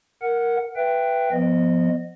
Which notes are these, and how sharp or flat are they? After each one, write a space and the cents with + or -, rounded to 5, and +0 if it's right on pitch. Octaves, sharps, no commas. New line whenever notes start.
A#4 +0 F#5 -5
B4 +0 E5 +25 G5 +0
F3 +0 B3 +0 D#5 -20